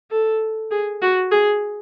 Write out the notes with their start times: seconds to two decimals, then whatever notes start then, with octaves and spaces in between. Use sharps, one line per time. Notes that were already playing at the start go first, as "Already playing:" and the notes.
0.10 A4
0.71 G#4
1.02 F#4
1.31 G#4